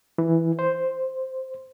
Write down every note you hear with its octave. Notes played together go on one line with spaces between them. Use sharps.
E3
C5